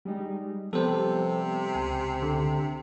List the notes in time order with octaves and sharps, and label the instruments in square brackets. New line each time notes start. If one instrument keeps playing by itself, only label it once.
[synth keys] G3 G#3 D#4
[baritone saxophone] C3 [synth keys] F3 G3 B3 [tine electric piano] A4 C5
[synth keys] C#2 [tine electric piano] G#5
[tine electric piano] D3